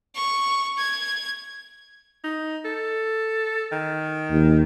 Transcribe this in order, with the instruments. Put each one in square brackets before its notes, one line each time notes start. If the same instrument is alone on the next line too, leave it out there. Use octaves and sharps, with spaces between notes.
[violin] C#6
G#6
[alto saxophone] D#4
A4
D#3
[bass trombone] D#2